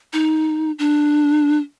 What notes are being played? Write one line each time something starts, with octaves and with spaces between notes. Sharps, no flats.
D#4
D4